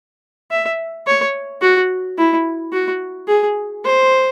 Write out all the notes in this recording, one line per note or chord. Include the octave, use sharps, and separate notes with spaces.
E5
C#5
F#4
E4
F#4
G#4
C5